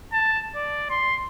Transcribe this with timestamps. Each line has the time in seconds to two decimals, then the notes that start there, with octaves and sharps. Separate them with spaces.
0.12 A5
0.56 D5
0.90 C6